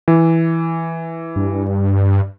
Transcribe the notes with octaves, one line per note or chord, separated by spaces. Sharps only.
E3
G2